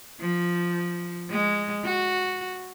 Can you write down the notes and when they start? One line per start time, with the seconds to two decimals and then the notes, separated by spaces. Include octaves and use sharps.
0.20 F3
1.30 G#3
1.84 F#4